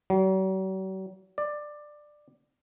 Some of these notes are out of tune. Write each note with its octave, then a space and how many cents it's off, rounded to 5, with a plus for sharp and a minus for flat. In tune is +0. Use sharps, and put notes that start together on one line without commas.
F#3 +45
D5 +15